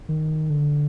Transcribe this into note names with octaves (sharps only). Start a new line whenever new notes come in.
D#3
D3